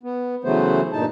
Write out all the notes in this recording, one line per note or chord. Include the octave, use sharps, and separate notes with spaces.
B3
C#3 E3 F#3 A3 B3 C5
G2 A#2 D#4 A5